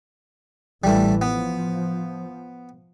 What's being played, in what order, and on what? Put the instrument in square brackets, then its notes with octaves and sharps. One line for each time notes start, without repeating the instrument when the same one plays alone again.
[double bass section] A1 E3 [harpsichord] G3 A3
[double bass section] F3 [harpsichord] B3